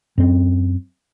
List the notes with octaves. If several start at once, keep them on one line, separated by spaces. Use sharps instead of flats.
F#2 C4